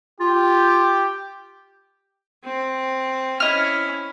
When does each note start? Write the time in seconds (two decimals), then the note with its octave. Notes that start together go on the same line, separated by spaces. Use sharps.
0.20 F4 G4
2.45 C4
3.40 C#4 E4 D#5 F6